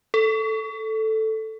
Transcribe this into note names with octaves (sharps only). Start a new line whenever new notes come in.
A4